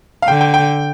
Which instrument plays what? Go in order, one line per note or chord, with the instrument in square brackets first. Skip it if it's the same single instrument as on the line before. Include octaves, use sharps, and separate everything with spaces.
[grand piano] F5
[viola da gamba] D3 [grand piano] G5
[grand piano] G5
G5